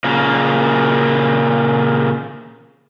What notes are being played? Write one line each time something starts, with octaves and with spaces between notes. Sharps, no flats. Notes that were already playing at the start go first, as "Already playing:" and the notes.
A#2 C#3 A#3